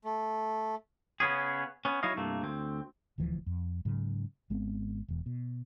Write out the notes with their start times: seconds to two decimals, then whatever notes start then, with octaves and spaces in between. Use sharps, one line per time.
0.04 A3
1.20 C#3 B3 C#4 G#4
1.85 B3 C#4
2.03 F#3 D#4 E4 C#5 D#5 F5
2.16 C2 G2 A3 A#3
2.42 D2 C4
3.18 D#1 D2 E3 F3
3.46 F2
3.85 G#2 C#3 F#3
4.50 G#1 G#3 B3 C4
5.08 E1 E2
5.26 B2